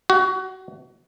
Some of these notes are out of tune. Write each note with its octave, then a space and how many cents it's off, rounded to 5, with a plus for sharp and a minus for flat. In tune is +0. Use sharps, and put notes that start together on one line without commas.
F#4 +25